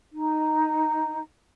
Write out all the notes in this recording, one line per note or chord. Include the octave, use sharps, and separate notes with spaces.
D#4